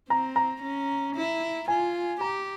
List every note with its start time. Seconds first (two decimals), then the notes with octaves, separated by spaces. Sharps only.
0.10 C4 A#5
0.36 A#5
0.62 C#4
1.16 E4
1.68 F4 G#5
2.21 G4 A#5